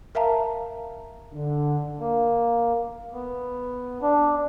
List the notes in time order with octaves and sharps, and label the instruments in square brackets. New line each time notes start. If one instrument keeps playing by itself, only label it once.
[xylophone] A#4 E5 F5 A5 A#5
[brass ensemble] D3
[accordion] A#3
B3
D4